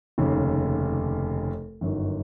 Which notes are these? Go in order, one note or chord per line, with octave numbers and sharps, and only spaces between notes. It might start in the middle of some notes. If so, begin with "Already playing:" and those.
F1 D#2 C#3
G1 F#2 D#3